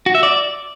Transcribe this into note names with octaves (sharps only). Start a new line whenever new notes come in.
F#4
E5
D5